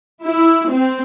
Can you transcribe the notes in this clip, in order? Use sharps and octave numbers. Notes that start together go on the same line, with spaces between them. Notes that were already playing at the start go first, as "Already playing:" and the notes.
E4
C4